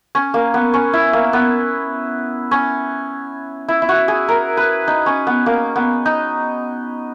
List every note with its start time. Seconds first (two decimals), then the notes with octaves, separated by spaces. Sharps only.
0.15 C#4
0.34 A#3
0.54 B3
0.74 C#4
0.93 E4
1.13 A#3
1.33 B3
2.51 C#4
3.68 E4
3.82 E4
3.89 F#4
4.08 G#4
4.29 A#4
4.57 B4
4.88 D#4
5.06 C#4
5.27 B3
5.46 A#3
5.76 B3
6.06 D#4